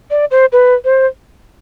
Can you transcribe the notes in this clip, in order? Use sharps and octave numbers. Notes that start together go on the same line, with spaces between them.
D5
C5
B4
C5